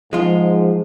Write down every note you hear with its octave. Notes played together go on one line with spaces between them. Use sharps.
G#2 F3 G#3 F4